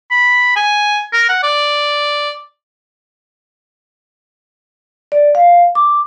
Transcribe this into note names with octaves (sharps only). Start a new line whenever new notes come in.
B5
G#5
A#4
F#5
D5
D5
F5
D6